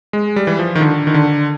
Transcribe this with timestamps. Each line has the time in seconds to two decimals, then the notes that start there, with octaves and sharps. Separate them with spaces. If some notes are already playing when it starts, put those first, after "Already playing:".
0.13 G#3
0.36 G3
0.47 E3
0.59 F3
0.75 D#3
0.81 D3
1.07 D#3
1.14 D3